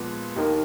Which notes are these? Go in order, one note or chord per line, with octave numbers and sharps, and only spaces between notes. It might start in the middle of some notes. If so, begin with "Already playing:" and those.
Already playing: A#2 F3 G#3 B3
D#2 D#3 A#3 D#4 A#4